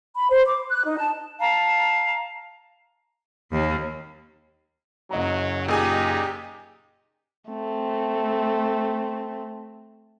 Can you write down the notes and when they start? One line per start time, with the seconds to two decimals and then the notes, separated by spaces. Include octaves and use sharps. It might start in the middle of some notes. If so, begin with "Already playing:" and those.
0.15 B5
0.29 C5
0.45 D6
0.69 F#6
0.86 D#4
0.98 A5
1.40 F5 A5 A#5
3.52 D#2
5.11 F#1 F#3 D#5 A#5
5.68 A#2 D#4 G4 G#4 G#5
7.50 A3 C4